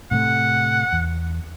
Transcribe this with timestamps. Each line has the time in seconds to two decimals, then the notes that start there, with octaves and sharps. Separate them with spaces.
0.11 A2 C3 A3 F#5
0.93 E2